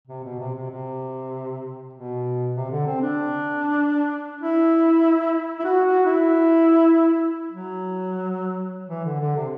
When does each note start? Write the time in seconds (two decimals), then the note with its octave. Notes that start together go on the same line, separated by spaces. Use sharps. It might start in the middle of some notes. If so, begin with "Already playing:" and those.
0.07 C3
0.23 B2
0.39 C3
0.54 C3
0.70 C3
1.93 B2
2.55 C3
2.71 D3
2.87 C4
3.02 D4
4.41 E4
5.59 E4
5.64 F#4
5.85 F#4
6.06 E4
7.50 F#3
8.89 E3
9.05 D3
9.20 D3
9.36 C3